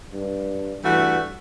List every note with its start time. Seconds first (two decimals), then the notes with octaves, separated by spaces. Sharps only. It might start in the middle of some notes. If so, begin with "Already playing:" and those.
0.13 G2
0.85 G2 E3 A3 F#4